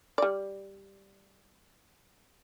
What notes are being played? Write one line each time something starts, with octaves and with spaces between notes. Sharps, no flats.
G3 D5